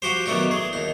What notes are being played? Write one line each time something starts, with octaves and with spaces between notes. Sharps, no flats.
F3 F#4 G4 C5
D#3 F#3 A3 B3 D4 F#4
E3 G#4
D#2 D#4